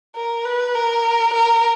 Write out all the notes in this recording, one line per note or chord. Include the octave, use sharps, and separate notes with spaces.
A#4
B4
A#4
A#4